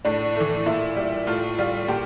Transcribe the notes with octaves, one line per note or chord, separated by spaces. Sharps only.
A2 D4
E3 A3
A#2 E4
G3
A2 F4
G3 F4
A#2 G4